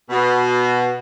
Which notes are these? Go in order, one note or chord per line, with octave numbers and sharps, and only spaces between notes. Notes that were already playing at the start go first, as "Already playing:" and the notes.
B2